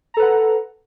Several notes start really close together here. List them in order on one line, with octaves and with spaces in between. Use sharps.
A#5 A4 B4 F#5